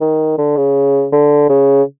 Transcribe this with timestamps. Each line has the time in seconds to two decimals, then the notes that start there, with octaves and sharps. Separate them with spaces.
0.01 D#3
0.38 D3
0.57 C#3
1.13 D3
1.50 C#3